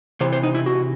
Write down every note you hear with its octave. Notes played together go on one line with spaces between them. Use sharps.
C3 E3 C5
C5
D#4
E4
F#4